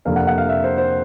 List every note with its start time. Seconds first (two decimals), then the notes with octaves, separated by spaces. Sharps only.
0.05 F2 C3 F3 A#3 D4 F5
0.16 F#5
0.27 F#5
0.38 F5
0.49 E5
0.64 C5
0.78 C5